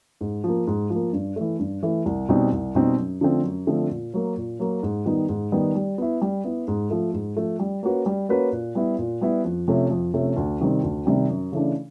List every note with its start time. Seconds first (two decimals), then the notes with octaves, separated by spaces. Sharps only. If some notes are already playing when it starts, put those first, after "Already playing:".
0.21 G#2
0.44 F3 A#3
0.67 G#2
0.90 F3 A#3
1.13 G2
1.36 E3 A3
1.59 G2
1.83 E3 A3
2.06 C2
2.29 B2 G3 C4 D#4
2.52 C2
2.75 B2 G3 C4 D#4
2.98 F#2
3.21 D3 F3 A3 C4
3.44 F#2
3.67 D3 F3 A3 C4
3.90 A#2
4.14 F#3 A#3
4.37 A#2
4.59 F#3 A#3
4.83 G#2
5.06 D#3 G3 B3 D#4
5.29 G#2
5.52 D#3 G3 B3 D#4
5.75 G3
5.98 B3 E4
6.22 G3
6.44 B3 E4
6.68 G#2
6.90 F3 A3
7.14 G#2
7.37 F3 A3
7.59 G3
7.83 A#3 C#4 F#4 B4
8.06 G3
8.29 A#3 C#4 F#4 B4
8.52 A#2
8.75 G3 B3 E4
8.98 A#2
9.21 G3 B3 E4
9.45 F2
9.68 C3 F3 A3 C#4
9.91 F2
10.14 C3 F3 A3 C#4
10.37 D2
10.60 C3 D#3 G3 C4
10.83 D2
11.06 C3 D#3 G3 C4
11.29 F#2
11.52 C#3 E3 A3 D4